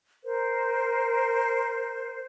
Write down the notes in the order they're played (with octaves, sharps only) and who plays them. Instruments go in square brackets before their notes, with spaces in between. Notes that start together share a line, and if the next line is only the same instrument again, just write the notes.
[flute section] A#4 C5